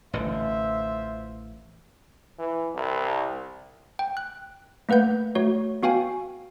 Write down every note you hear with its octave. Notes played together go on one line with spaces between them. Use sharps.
A1 D3 F4 C5 E5
E3
C2
G5
F#6
A3 A#3 B4 F#5 G6
A3 F#4 C#5
B3 F#4 F5 G5 G#5